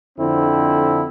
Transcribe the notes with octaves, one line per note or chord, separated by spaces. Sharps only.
F2 D3 C4 E4